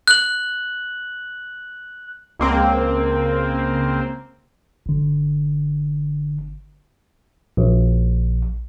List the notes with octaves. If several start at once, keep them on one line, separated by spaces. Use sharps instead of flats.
F#6 F#7
C#2 A#3 C4
G1 D3
A#1